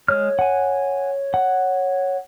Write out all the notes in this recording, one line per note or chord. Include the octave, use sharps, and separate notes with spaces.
G#3 C#5 F6
F#5 G#5
F#5